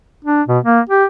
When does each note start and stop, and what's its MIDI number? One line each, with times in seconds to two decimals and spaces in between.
0.24 0.42 62
0.48 0.59 47
0.64 0.80 58
0.89 1.05 67